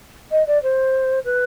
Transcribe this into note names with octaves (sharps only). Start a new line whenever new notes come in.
D#5
D5
C5
B4